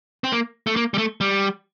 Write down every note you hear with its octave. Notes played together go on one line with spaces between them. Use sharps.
C4
A#3
A3
A#3
G3
A3
G3